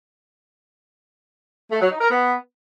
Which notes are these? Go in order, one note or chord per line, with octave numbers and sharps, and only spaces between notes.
A3
F#3
D#4
A#4
B3